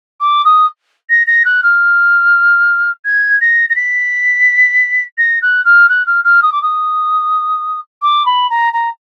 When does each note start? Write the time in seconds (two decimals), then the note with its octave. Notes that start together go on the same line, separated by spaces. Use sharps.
0.20 D6
0.45 D#6
1.10 A#6
1.27 A#6
1.45 F#6
1.63 F6
3.05 G#6
3.41 A#6
3.70 A#6
3.76 B6
5.18 A#6
5.42 F#6
5.65 F6
5.89 F#6
6.07 F6
6.24 F6
6.42 D#6
6.52 D6
6.62 D#6
8.02 D6
8.26 B5
8.50 A#5
8.73 A#5